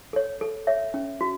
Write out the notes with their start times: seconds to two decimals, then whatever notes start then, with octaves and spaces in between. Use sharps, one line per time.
0.13 A4 C#5
0.41 A4
0.67 C#5 E5
0.94 C#4
1.21 F#4